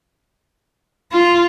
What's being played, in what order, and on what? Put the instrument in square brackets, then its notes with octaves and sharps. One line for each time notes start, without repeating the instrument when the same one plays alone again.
[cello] F4